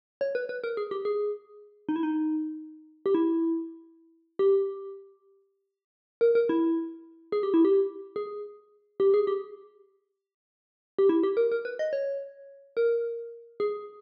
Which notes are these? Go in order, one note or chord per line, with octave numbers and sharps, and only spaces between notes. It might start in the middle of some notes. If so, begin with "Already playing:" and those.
C#5
B4
B4
A#4
G#4
G4
G#4
D#4
E4
D#4
G4
E4
G4
A#4
A#4
E4
G#4
G4
E4
G4
G#4
G4
G#4
G4
G4
E4
G4
A#4
A#4
B4
D#5
C#5
A#4
G#4